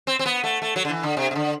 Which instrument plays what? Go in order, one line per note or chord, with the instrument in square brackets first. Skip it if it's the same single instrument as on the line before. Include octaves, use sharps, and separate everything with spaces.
[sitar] C4
C4
B3
A3
A3
F#3
D3
E3
D3
C3
C3
D3